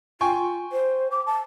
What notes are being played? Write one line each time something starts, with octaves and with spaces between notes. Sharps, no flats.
F4 G5 G#5 C#6
C5
D6
A5